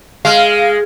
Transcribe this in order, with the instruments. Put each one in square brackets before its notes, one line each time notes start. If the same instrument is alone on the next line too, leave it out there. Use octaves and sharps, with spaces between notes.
[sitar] G#3 [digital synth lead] F5